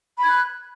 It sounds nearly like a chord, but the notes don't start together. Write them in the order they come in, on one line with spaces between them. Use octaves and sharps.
B5 G#6 F#6